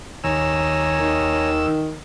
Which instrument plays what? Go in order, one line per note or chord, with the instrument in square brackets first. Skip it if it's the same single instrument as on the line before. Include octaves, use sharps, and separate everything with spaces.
[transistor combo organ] D#2 E6 [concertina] C#5 G#5 A#5
[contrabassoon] D#3